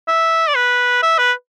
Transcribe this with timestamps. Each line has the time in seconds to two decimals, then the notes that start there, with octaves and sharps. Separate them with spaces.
0.08 E5
0.49 D5
0.56 B4
1.02 E5
1.18 B4